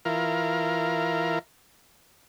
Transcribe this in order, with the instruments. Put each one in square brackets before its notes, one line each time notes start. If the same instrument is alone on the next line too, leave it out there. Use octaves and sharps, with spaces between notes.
[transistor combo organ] E3 F4 A#4